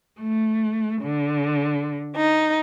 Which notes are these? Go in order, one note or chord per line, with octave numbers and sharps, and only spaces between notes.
A3
D3
D#4